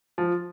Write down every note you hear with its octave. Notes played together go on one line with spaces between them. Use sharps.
F3